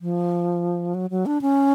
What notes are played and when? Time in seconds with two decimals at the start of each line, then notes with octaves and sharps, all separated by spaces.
0.01 F3
0.94 F#3
1.10 F#3
1.26 D4
1.41 C#4